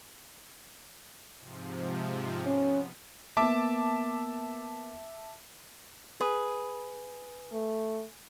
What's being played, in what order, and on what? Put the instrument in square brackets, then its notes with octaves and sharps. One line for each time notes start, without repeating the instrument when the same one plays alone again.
[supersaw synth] G#2 C3 F3
[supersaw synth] B3 [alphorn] C#4
[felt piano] A#3 B3 [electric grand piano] E5 A5 D6
[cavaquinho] G#4 [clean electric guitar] B4
[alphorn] A3